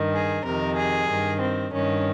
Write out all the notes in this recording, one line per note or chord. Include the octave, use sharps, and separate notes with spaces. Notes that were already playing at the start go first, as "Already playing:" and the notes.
Already playing: G2 D#3
G#4
F2 C3 D#3 A#4
G#4
G2 D#3
C4
G2 D#3 C#4